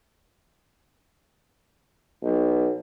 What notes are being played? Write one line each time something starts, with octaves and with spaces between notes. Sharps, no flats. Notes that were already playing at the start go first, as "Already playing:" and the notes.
B1